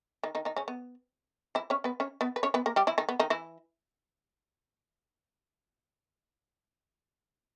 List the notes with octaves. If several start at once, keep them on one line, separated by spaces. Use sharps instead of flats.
D#3 D#4
D#3 D#4
D#3 D#4
C#3 C#4
B3
E3 E4
C#4 C#5
B3 B4
C#4 C#5
B3 B4
B4
C#4 C#5
B3 B4
A#3 A#4
G3 G4
E3 E4
D#3 D#4
B3
D#3 D#4
E3 E4